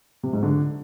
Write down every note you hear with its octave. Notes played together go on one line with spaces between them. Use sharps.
C3
G#2
D3